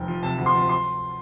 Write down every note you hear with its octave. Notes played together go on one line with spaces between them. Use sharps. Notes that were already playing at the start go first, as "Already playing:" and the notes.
Already playing: F1 F2 G5
F3
C3 A5
D2
C6
F3
C6